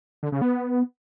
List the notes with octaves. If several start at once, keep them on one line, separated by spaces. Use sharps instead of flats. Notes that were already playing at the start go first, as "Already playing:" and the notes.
D3
C#3
B3